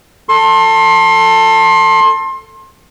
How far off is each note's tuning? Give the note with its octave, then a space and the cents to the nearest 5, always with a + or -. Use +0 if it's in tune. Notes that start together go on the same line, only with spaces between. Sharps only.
A4 +20 C6 +30